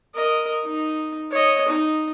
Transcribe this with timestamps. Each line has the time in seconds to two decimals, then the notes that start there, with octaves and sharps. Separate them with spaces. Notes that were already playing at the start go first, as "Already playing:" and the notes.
0.15 A#4 D#5
0.64 D#4
1.32 C#5 D#5
1.68 D#4